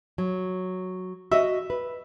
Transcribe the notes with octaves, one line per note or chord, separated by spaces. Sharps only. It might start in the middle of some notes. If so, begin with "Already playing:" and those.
F#3
F#4 D#5 E5
B4